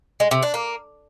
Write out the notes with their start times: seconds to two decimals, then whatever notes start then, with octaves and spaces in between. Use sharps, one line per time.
0.20 G#3
0.31 C3
0.43 D4
0.54 A#3